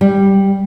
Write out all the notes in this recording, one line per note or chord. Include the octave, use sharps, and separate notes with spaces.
G3